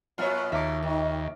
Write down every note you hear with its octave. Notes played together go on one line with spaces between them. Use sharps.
F#2 A#2 B3 F4 C#5
D#2 B2 E5 A#5 D6
D#3